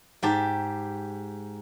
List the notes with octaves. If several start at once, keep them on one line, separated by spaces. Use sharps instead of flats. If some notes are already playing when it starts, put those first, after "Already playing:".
G#2 G4 A5